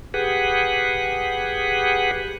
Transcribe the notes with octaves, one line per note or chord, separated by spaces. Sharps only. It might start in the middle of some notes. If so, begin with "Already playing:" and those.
G4 G#4 B4 F#5